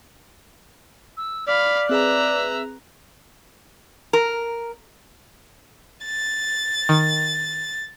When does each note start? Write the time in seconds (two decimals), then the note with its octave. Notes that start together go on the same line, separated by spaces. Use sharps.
1.17 E6
1.48 D5 F5 B5 B6
1.89 C4 G#4 B4 E5 A#5 F#6
4.13 A#4
6.05 A6
6.89 D#3